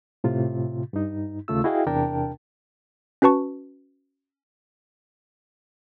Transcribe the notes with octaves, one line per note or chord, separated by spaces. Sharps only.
A2 C3 F4
G2 D#4
D#2 C#3 A3 F4 E6
E4 F#4 G#4 D#5 F5 G5
E2 C3 D4 A#4 G5 A5
C#4 F#4 B4 A5 C#6